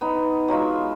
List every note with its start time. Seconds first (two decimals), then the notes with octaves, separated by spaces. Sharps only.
0.01 B3 D#4
0.48 F#3 G#3 F4 E5